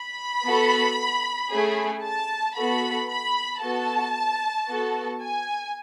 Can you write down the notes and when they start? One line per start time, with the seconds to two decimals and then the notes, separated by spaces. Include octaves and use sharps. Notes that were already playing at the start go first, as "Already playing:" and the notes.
Already playing: B5
0.45 B3 F#4 A4
1.50 A3 C#4 G#4
2.03 A5
2.57 B3 F#4 A4 B5
3.09 B5
3.62 B3 F#4 A4 A5
4.68 B3 F#4 A4
5.22 G#5